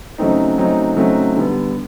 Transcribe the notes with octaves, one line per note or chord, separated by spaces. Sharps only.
C#3 F#3 A3 C4 D#4
C#3 F#3 A3 C4 D#4
C#3 F#3 A3 C4 D#4
D3 G3 B3